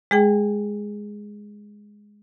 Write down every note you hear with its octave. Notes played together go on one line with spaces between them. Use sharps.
G#3 G#4 G5